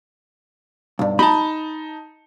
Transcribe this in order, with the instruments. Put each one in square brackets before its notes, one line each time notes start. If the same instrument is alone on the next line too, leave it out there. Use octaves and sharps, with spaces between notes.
[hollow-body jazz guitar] B1 G2
[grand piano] D#4 A5 [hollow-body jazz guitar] B5